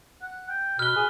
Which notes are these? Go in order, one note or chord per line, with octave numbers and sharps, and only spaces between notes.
F#5
G5
B2 B4 F6 G7
G#4